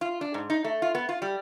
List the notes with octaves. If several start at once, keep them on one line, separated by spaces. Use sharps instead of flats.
F4
D4
G#2
D#4
A3
F4
B3
F4
G3